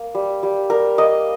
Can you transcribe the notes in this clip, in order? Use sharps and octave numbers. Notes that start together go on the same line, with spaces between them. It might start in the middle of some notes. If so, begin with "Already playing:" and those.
Already playing: A#3
G3
G3
G3 A#4
A#3 D#5